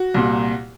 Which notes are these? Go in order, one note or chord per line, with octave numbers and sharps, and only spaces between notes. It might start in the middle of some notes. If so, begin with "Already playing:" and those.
Already playing: F#4
C2 A#2